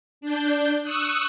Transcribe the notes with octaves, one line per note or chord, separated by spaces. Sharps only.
D4 G6
C#6 D#6 E6 F#6